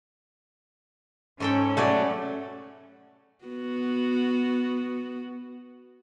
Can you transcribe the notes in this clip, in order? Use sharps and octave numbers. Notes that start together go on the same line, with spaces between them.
G#2 C#4 A4 G5
F#3 G3 A3 C#5 D5
B3 F#4